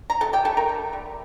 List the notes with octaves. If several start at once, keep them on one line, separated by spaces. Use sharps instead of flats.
A#5
C3 A4 A5
G4 G5
A3 A4 A5
A#4 A#5
D3
G3